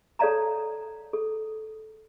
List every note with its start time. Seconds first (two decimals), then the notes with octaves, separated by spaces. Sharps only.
0.19 A4 C#5 D5 F5 A5 A#5
1.13 A4